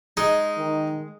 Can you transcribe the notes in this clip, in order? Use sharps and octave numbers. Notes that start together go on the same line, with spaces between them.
G#3 D#4
D#3